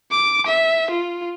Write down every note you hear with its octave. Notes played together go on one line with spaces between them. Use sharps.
D6
E5
F4